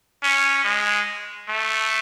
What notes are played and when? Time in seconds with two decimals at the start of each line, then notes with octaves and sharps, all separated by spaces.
0.23 C#4
0.64 G#3
1.48 A3